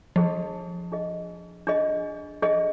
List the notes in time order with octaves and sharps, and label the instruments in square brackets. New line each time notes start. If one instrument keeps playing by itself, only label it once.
[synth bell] F3 [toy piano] D4 G#4 D#5
[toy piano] D4 G#4 D#5
D4 G#4 D#5
D4 G#4 D#5